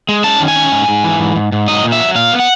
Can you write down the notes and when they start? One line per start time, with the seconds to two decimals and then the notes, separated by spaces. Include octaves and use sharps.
0.09 G#3
0.24 C#4 A5
0.40 D#3
0.48 G#5
0.56 C#4
0.72 G#2
0.88 G#2
1.04 E3
1.20 G#2
1.36 G#2
1.52 G#2
1.68 F#3 D#5
1.84 A#2
1.92 E5
2.00 F#3
2.15 A#2 F5
2.32 B3
2.40 F#5